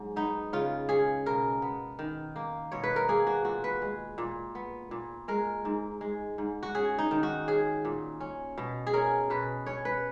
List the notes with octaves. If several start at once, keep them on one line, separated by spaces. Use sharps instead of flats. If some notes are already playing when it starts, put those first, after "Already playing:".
Already playing: G#2 F#3
B3 D#4
C#3 F4
C#4 G#4
B2 A#4
B3
D#3
A#3
B2 C#5
B4
A#4
A#3 G#4
F#4
A#2 F#4
B4
G#3
A#2
B3
A#2
G#3 A#4
G#2
G#3
G#2
F#4
C#4 G#4
D#4
D#3
F#4
C#4 G#4
A#2
C#4
B2
G#4
C#4 A#4
B2 B4
C#4 C#5
B4